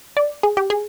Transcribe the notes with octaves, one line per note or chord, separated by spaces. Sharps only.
D5
G#4
G4
G#4